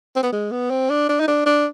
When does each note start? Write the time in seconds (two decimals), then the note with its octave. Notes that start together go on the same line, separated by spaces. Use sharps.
0.16 C4
0.23 B3
0.33 G#3
0.51 B3
0.71 C4
0.90 D4
1.09 D4
1.20 D#4
1.28 D4
1.46 D4